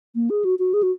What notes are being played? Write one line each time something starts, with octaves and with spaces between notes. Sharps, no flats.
A#3
G#4
F#4
F#4
G#4
F#4